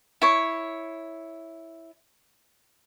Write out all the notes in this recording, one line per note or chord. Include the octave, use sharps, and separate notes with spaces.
E4 C#5